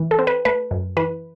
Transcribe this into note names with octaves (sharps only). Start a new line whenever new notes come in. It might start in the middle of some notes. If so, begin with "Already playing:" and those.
Already playing: E3
A4
C4
B4
A3 B4
F#2
E3 B4